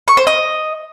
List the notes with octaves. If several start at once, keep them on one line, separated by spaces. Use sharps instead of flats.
C#6
C5
D#5